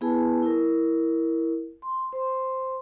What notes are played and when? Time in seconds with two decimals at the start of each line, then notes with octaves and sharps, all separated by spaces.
0.01 B3 E4 G#4 B4 G#5 A5
0.43 E4 A#4
1.82 C6
2.13 C5 C6